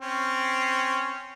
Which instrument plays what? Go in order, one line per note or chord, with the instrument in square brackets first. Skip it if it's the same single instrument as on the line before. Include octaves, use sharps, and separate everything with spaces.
[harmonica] C4 C#4